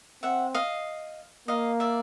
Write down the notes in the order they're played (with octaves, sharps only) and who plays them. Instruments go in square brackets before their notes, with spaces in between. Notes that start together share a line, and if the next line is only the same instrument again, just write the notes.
[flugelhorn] C4 [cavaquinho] E5 F#5
[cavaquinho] D#5 F5
[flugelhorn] A#3 [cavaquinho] D#5 F5
[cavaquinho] D5 E5